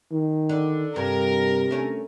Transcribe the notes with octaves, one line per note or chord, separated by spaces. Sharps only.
D#3
D3
G2 C3 A#4
A3 C#4